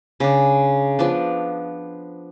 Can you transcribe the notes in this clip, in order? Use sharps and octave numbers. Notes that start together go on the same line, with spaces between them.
C#3 D4
F3 B3 D4